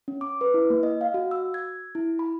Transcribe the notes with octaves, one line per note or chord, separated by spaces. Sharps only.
C#4
D6
B4
E4
A#3
D#5
F5
F#4
E6
G#6
E4
B5